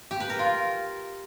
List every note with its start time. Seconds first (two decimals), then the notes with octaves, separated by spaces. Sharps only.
0.11 G4
0.20 B4
0.30 A#4
0.39 F4